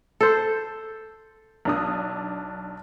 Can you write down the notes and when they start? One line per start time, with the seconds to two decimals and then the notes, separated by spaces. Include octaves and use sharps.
0.21 A4 C5
1.65 B1 D4 D#6